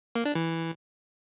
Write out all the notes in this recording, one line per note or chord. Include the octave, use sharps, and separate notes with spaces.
A#3
D4
E3